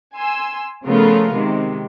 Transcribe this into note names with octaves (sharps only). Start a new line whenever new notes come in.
G#5 C6 E6
C#3 F3 A3 B3 F4 A#4
C3 D#3 G#3